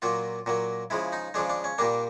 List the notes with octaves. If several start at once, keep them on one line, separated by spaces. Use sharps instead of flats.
A#2 F#3 A#3 F4
A#2 F#3 A#3
C#3 F3 G#3 E4
D#4
C#3 F3 G#3 D4
D4
C#4
A#2 G3 A#3 D4